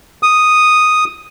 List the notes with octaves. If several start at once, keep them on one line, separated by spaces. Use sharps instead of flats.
D#6